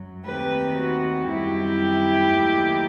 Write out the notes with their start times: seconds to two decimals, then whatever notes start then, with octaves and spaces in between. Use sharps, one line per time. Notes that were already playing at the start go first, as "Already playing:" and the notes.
Already playing: F#2 F#3
0.26 D#2 D#3 A3 C4 G4 B4
0.77 F#4
1.27 F#2 D#3 G3 C4 E4 G4
2.30 D#2 D#3 F#3 A3